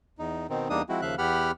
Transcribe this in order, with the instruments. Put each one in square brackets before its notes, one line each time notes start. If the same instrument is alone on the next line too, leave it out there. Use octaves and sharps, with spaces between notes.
[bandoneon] E2 D#4
B2 D#3 C4 D#4
E2 G3 A#3 D4 D#4 D#6
F3 G#3 C4 E4 F#4
D#2 C#3 F3 E5 F5 F#6
E2 B3 G4 F#5 B5 F6